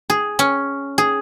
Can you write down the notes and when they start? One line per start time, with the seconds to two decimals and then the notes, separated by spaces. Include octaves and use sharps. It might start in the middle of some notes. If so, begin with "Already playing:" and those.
0.10 G#4
0.39 C#4
0.98 G#4